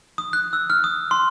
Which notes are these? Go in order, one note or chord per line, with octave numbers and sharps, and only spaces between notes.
D#6
F#6
E6
F6
D#6
C6